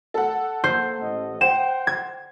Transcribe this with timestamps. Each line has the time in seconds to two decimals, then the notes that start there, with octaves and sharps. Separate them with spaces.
0.14 A4 F#5
0.64 A#3 C5
1.01 A1 D#5
1.41 C5 F#5 G5 E7
1.87 G#6